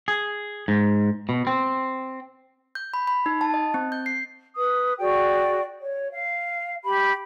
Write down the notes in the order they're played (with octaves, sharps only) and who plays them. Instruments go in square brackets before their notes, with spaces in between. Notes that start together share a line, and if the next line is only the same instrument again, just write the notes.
[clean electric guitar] G#4
G#2
B2
C4
[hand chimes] G6
B5
B5
D#4
A5
D#5
C4
G6
C7
[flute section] B4 D#6
F#4 G#4 D5 G5
C#5
F5
G4 B5